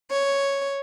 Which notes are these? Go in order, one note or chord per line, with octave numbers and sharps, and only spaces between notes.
C#5